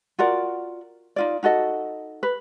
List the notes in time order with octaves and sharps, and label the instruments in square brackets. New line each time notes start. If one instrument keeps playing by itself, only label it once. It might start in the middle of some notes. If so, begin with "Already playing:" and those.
[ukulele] F4 F#4 A#4 D5
D#4 F4 D5
D#4 F#4 A4 D#5
B4